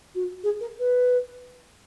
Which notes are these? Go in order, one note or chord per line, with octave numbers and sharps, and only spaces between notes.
F#4
G#4
A#4
B4